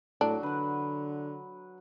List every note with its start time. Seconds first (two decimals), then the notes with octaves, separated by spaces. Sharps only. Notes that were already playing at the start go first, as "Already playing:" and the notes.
0.21 A2 F#3 D4
0.43 D3 B4 F#5